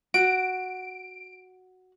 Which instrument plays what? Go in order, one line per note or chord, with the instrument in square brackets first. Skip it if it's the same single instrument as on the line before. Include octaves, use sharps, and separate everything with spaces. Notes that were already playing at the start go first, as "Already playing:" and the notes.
[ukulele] F#4 [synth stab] D7